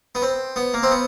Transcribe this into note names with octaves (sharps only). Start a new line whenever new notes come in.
B3
C4
B3
A#3
C4
B3